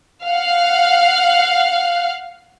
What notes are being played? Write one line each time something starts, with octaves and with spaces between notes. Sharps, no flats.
F5 F#5